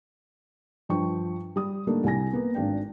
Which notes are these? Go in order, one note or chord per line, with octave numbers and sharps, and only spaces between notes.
G2 F3 G5 C#6
G3 D#6
D3 G3 A3 A#3 D4 D#4
C2 G3 G#5 A#6
A#3 B3
G#1 D4 G5